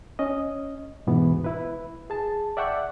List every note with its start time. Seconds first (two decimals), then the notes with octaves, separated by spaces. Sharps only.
0.19 C#4 D#5
1.07 D#2 G#2 B2 E3 B3
1.44 E4 B4
2.10 G#4 A5
2.57 D5 E5 F#5 G5 C#6